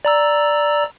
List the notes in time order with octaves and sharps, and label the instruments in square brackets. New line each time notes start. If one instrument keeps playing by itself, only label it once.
[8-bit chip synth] D5 A#5 E6